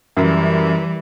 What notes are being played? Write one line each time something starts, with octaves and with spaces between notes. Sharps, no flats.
F#2 E3 G3